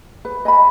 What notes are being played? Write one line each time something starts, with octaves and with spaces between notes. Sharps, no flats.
B4
D#5 G#5 B5